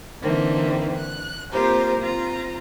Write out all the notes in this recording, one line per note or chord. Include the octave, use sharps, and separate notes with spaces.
D3 E3 A#3 C4 D#4
F#6
A#3 C4 F4 G4 A#4 C5
C4 F4 A#5